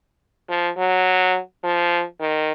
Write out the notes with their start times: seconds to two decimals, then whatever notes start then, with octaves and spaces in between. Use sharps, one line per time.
0.49 F3
0.78 F#3
1.63 F3
2.21 D#3